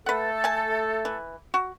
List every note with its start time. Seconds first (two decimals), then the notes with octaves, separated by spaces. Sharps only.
0.06 A3 A4 B4 F#5
0.44 G#5 A5
1.05 E3
1.54 F#4